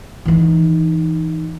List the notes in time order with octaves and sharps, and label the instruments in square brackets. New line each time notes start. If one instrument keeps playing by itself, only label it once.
[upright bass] E3 D#4